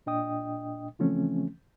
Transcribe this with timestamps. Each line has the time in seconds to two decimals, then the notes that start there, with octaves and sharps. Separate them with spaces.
0.06 A#2 D4 D#5 G5 D#6
0.99 C#3 E3 F3 A3 C4 C#4